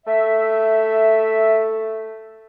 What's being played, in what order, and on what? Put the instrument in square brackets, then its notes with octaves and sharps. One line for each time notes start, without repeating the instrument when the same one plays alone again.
[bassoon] A3 [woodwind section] E5